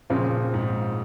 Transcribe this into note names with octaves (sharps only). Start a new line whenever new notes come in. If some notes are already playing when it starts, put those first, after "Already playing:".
A#2 C#3 F3 C4 F4
G#2